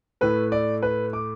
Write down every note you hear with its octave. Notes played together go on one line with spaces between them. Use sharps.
A2 A3 B4
D5
B4
D6